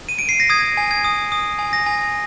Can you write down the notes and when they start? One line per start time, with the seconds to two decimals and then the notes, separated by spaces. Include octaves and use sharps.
0.09 D#7
0.19 D7
0.29 C7
0.40 A#6
0.50 D#6 G#6
0.77 G#5
0.91 G#6
1.04 D#6
1.32 D#6
1.59 G#5
1.73 A#6
1.86 G#5